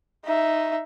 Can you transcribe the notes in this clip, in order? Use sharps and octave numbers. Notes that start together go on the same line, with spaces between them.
D#4 E5